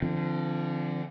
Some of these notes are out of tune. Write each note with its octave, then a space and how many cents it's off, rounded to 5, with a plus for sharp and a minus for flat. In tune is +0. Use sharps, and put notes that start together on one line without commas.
D3 +0 F3 -35 C4 +0